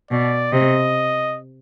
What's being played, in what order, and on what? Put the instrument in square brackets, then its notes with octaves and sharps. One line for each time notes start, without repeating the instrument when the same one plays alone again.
[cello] B2 [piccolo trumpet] D5
[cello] C3 [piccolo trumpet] D#5